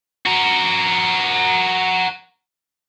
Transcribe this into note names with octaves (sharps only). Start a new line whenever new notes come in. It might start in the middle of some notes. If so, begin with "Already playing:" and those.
F#4 A#4